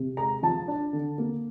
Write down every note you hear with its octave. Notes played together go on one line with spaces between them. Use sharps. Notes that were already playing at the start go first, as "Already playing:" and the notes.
Already playing: C3
G#3 A#5
F3 A5
D4
D3
A#3